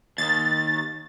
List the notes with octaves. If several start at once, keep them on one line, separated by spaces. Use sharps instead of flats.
D#2 D#3 A6